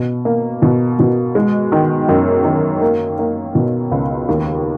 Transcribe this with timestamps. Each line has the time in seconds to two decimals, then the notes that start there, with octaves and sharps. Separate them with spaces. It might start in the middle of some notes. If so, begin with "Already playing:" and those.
Already playing: B2
0.25 A#3
0.62 B2
0.99 B2
1.35 G#3
1.72 D#3
2.09 F#2
2.45 D#3
2.82 A#3
3.19 A#3
3.55 B2
3.91 C#2
4.28 D#2